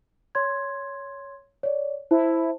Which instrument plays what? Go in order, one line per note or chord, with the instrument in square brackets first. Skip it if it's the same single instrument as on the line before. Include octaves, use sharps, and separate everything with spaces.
[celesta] C#5 C6 G#6
C#5 D5
[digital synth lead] E4 [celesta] C5 A5